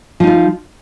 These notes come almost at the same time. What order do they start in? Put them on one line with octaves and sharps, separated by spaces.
F3 D#4 F4